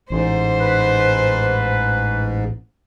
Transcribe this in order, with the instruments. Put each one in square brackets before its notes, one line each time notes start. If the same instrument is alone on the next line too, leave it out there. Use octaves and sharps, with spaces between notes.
[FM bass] A1 [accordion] G#2 [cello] C5
[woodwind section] B4